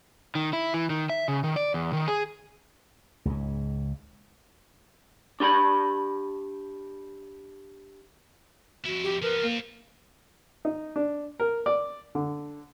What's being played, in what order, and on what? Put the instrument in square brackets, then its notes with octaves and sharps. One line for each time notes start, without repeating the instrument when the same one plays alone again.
[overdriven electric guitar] D#3
E4
E3
D#3
E5
C#3
D#3
D5
E2
D#3
G#4
[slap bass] C#2 G#2
[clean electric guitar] D4 G4 A#5 B5
[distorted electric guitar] F2 E4 [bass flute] F#4
[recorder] G4
[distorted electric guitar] F3 B3 [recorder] A#4 [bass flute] B4
[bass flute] A#3 [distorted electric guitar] C4 F4
[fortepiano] D#4
D4
A#4
D5
D3